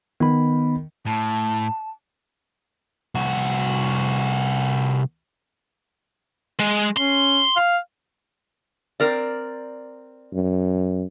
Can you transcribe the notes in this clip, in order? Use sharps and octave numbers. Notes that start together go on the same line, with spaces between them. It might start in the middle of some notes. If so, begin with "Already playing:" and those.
D#3 B3 B5
A2 A5
C2 F#4
G#3
C#4 C6
F5
C4 A#4 D5
F#2